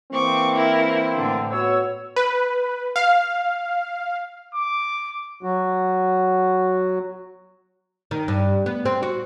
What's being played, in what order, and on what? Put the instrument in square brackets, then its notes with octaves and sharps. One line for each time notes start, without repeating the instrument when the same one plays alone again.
[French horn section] E3 A#3 C4 [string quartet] C#6 D6
[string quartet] E4 A#4
A2 D3
[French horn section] B3 F#4 C#5 [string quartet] E6
[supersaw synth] B4
F5
[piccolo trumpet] D6
[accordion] F#3 F#4
[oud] D#3
G2
B3
C4
F#4